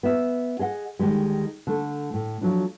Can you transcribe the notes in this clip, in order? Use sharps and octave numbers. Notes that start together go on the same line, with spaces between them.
B3 E5
G#4 D#5 F5 F#5
D2 D#3 E3 G3 G#3
D3 A3
A2
F3 F#3 A3 D4